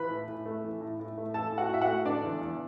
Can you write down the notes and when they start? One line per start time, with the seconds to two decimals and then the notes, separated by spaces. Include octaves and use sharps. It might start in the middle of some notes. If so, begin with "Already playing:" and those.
Already playing: E3 B4 B5
0.11 A2
0.28 A2
0.46 A3
0.64 E3
0.81 A2
1.00 A2
1.17 A3
1.34 E3 A4 A5
1.52 A2
1.58 F#4 F#5
1.70 A2 E5
1.81 F#4 F#5
1.88 A3
2.05 D3 D4 D5
2.23 E2
2.41 E2